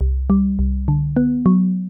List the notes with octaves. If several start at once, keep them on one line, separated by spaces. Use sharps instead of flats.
C2
G3
C2
D3
B3
F#3